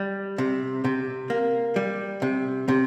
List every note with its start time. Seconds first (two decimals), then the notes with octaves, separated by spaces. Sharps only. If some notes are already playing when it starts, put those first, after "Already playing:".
Already playing: G3
0.38 C3
0.84 C3
1.30 A#3
1.76 G3
2.22 C3
2.68 C3